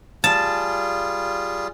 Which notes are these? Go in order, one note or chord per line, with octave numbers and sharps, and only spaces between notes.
G3 F4 G#4 A5